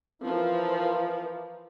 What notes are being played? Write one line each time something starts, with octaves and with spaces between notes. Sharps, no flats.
E3 F3 A#4